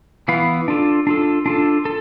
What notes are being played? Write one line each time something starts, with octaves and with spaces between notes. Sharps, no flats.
E3 B3 E4 B4 F5
D4 F4 A4
D4 F4 A4
D4 F4 A4
A4